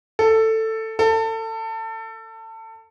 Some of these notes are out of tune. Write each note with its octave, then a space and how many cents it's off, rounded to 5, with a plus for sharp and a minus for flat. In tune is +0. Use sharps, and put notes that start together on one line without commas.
A4 +10
A4 +25